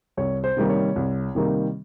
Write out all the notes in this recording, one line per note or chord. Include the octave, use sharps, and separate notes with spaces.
C2 C#5
C5
C3 D#3 G3 A#3
C#5
C2
C3 D#3 G3 A#3